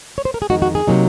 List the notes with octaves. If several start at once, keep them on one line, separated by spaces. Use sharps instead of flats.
C#5
C5
A#4
G#4
F2 D#3 G#3 D#4 F#4
F#4
G#4
C3 F#3 A#3 D#4